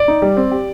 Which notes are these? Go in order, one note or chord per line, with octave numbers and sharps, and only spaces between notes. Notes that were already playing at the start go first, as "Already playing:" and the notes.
Already playing: D5
D#4
G3
C4
G4